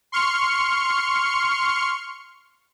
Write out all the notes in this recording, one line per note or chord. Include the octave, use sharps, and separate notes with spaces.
C6 C#6 F6 C#7